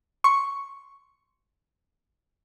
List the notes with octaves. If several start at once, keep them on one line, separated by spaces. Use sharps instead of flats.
C6 C#6